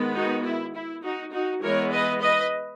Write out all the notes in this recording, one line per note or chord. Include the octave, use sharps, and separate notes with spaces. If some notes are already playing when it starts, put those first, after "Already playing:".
Already playing: D#3 G#3 B3
D#4 F#4
E4
E4
D#4 F#4
D#4 F#4
E3 G#3 B3 A#4 C#5
B4 D#5
B4 D#5